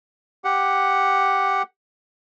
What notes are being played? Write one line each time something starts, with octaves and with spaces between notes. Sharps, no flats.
G4 F#5